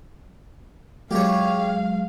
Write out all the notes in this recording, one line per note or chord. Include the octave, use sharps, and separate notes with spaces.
F#3 G#3 G4 C#5 F5